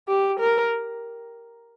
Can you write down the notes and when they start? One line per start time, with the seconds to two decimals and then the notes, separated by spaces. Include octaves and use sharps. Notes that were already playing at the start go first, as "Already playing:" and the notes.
0.08 G4
0.40 A#4